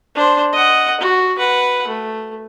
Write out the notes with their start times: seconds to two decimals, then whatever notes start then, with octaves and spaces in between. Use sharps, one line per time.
0.15 D4 C5
0.53 D#5 F#5
1.01 F#4
1.39 B4 F#5
1.88 A3